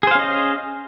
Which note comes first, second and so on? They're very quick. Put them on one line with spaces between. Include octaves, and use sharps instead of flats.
G#4 C5 F5 C#4 D#5